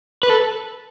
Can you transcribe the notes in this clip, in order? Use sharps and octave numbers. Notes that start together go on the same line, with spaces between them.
B4
A4